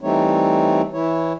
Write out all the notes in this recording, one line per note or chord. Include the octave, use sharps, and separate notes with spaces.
E3 G3 A3 C4 D#4 C#5
E3 E4 C#5